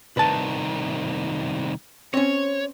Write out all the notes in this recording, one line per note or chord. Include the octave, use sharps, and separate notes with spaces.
C2 D#3 B4 A5
C4 C#4 C#5